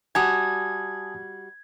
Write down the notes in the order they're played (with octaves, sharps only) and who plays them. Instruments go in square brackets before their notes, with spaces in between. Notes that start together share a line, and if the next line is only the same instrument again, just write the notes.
[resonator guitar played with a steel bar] G3 F#4 [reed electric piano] G#5 A5 D#6 [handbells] G#6